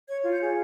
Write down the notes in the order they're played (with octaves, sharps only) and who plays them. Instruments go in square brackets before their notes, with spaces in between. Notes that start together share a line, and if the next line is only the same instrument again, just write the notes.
[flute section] C#5 G#6
F4
G6
G#4